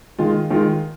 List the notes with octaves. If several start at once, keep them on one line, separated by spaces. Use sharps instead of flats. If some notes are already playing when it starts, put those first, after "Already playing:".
D#3 G#3 F4
D#3 G#3 F4